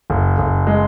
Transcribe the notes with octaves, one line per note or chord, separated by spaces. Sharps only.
F#1
F#1
G#3